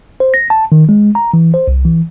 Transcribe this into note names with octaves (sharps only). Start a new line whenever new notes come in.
C5
A#6
A5
D#3
G#3
A#5
E3
C5
C2
E3